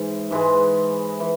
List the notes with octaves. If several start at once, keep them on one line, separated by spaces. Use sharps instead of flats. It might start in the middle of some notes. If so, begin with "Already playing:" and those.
Already playing: G#2 E3
G#2 E3 G#3
E3